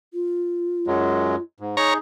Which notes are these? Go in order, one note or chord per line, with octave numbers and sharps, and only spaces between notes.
F4
F#2 F#3 G#3
G#2
D#4 G#4 C#5 A#5